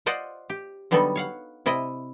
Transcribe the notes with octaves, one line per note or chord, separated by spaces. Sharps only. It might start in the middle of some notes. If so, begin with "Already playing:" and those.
F4 C5 D5 D#5 F#5
G4
D3 F#3 G3 B3 D#4 A4
C#5 F5 F#5
C3 E4 D5 D#5